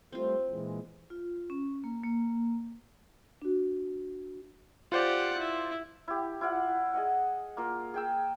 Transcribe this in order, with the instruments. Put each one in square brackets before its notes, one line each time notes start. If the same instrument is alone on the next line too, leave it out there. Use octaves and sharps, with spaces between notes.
[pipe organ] G3 A3 [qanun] C4 F4
[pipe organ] A#2 E3 G#3
[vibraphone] F4
C#4
A#3
A#3
[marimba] D4 F#4
[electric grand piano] F4 C5 D5 [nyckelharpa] G4 F#5
[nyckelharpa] E4
[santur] E4 G4
E4 F4 D5 F#5
G#4 D#5 F#5
A#3 F4 A#4
G#4 G5 E6